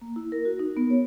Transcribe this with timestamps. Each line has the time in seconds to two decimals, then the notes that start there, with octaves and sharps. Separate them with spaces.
0.01 A#3
0.16 E4
0.32 A#4
0.45 F#4
0.59 D#4
0.77 B3
0.90 C#5